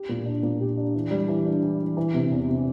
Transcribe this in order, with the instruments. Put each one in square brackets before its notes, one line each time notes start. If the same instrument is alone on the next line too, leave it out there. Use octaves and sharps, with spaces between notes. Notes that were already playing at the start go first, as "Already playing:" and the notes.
Already playing: [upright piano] G4
A#2
D4
A#2
G4
D4
E3
G3
E3
D4
E3
E3
E3
C3
E2
C3